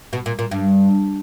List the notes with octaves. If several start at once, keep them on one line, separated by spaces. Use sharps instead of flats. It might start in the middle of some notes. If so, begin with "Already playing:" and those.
B2
A#2
A#2
G2